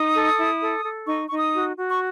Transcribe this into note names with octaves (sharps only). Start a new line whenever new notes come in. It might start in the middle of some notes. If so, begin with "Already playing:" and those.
Already playing: D#4 D#6
A4
E4
A4
A4
D#4 C#6
D#4 C#6
D#6
F#4
F#4
C#6